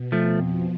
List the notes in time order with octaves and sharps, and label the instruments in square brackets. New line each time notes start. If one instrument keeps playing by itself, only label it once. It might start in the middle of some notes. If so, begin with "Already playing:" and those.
Already playing: [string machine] B2
[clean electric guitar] F3 A3
[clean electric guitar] F2 [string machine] F3